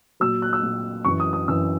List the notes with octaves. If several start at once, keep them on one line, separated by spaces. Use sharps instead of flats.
A#2 F#3 E6
F#6
E6
A#2 F#3
F#2 E3 C#6
D#6
D#6
F#2 E3 E6